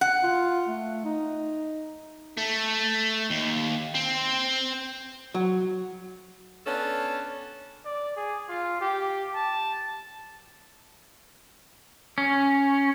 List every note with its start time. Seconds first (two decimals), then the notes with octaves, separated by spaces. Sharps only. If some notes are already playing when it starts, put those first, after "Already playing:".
0.01 F#5
0.23 F4
0.68 A3
1.04 D#4
2.38 A3
3.30 D#2
3.95 C4
5.34 F#3
6.66 B3 C#4 D4 A4
7.85 D5
8.16 G#4
8.49 F4
8.81 G4
9.35 A5
12.18 C#4